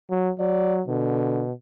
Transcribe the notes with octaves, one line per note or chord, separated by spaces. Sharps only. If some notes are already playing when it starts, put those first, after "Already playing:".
F#3
F#3 D5
B2 D3